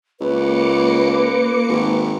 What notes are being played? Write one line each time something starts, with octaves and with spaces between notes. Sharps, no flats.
C#2 A#3 B4 D6 C#7
G#1